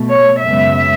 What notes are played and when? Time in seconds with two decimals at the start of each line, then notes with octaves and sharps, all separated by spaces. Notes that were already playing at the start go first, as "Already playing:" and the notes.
Already playing: B2 A3
0.12 C#5
0.44 F#2 C#3 G#3 B3 E5